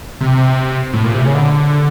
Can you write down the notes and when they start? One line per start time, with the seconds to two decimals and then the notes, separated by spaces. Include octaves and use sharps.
0.21 C3
0.94 A2
1.04 A#2
1.14 C3
1.24 C#3
1.34 D3